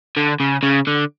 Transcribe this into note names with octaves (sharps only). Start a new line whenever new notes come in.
D3
C#3
C#3
D3